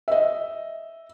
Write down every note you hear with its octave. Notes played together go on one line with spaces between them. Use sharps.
D#5 E5